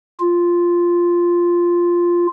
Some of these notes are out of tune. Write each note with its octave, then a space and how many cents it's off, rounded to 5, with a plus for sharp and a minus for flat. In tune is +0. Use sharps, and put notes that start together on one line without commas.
F4 -5